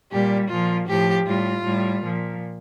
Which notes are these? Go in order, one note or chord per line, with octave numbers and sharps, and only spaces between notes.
A#2 G3 G4
A#2 F3 F4
A2 F3 G4
A2 G3 F4
A2 G3
A#2 F3